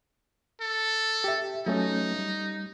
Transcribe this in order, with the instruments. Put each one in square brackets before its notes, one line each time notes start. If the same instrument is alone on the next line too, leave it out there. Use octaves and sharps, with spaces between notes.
[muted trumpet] A4
[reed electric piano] G4 E5
[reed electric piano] F#3 A3 C#4 [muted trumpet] D#4
[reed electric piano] G3